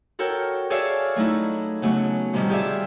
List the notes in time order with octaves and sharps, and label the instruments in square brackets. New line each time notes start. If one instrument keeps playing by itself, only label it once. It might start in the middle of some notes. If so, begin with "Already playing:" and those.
[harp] F#4 A4 A#4 C#5 G5
G#4 A4 C#5 D5 E5 F5
F#3 A3 D#4 E4
C#3 F#3 A3 B3 C#4
A2 C3 D#3 F3 G3
G4 G#4 D5 E5 F5